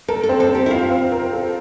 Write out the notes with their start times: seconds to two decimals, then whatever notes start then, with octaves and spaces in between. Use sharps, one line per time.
0.08 A4 A#4
0.23 A4
0.29 C4
0.40 A4
0.49 C4
0.55 G4
0.66 E4
0.70 F4 F5
0.91 C4
1.12 A#4
1.33 A4